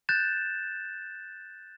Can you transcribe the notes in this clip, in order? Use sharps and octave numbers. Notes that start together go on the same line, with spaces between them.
F#6 G6 A6 E7